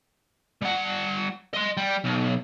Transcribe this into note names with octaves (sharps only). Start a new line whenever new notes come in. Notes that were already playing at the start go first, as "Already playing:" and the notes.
G3 F#5
D#5 C6
G3
B1